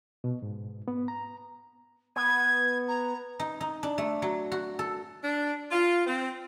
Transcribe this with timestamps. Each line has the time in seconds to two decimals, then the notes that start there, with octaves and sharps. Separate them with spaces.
0.24 B2
0.42 G#2
0.88 B3
1.08 A#5
2.16 B3 G#6
2.88 A#5
3.40 D#4
3.61 D#4
3.83 D4
3.98 A3
4.22 F#3
4.52 F#4
4.79 A4
5.23 D4
5.71 F4
6.06 C4